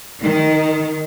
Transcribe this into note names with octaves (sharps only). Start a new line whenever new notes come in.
D#3